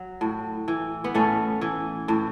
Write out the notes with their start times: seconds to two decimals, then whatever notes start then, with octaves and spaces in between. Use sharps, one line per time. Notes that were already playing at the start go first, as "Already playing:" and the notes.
Already playing: F#3
0.21 A2
0.68 E3
1.04 B3
1.14 A2 A3 C#4
1.61 E3
2.08 A2